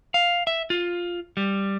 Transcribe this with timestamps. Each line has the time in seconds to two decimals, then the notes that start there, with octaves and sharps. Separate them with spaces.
0.14 F5
0.47 E5
0.70 F4
1.37 G3